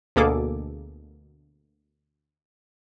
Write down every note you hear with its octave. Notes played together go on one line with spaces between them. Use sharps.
D2 B2 A#3 G#4 A4 D6